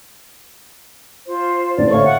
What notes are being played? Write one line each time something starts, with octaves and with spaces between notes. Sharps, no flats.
F4 C5
A1 D3 C5 D5
A4 C#5 E5 F5 C#6
F#5